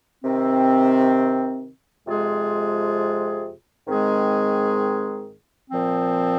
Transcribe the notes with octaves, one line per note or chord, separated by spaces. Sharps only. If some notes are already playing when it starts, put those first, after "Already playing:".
C3 D#3 C4
F2 C3 G#3 F4 G#4
G#2 D#3 G#3 C4 G#4
A#2 F3 C4